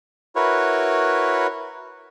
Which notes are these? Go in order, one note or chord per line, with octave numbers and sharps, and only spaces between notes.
E4 F#4 A#4 B4 C#5